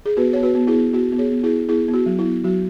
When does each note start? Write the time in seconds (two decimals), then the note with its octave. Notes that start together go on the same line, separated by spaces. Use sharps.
0.06 G#4
0.17 B3 F#4 B4
0.33 B3 C#5
0.43 F#4 B4
0.55 B3
0.67 E4 G#4
0.73 B3
0.93 B3 F#4
1.12 B3
1.18 G#4 C#5
1.31 B3
1.43 E4 G#4
1.49 B3
1.69 B3 E4 G#4
1.88 B3
1.94 F#4
2.06 F#3
2.19 E4
2.25 B3
2.44 F#3 F#4